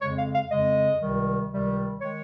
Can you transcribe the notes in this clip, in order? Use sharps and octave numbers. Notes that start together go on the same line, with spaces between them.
F2 C#3 G#3 C#5
F5
F5
F2 C#3 G#3 D#5
C#2 C3 D#3 G3
C#2 C3 D#3 G3
D#3 G#3 C#5